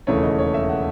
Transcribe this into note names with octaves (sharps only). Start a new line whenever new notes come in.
E1 D#2 C#3 E3 A3 C#5
D#5
C#5
E5
F#5